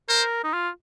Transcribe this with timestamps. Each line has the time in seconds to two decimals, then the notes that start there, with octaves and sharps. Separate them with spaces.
0.09 A#4 C5
0.44 D#4
0.53 F4